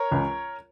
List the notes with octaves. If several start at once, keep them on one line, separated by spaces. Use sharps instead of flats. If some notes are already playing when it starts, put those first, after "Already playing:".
Already playing: A#4 C#5
C#2